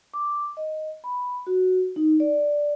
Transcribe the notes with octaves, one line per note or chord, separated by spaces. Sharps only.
D6
D#5
B5
F#4
D#4
D5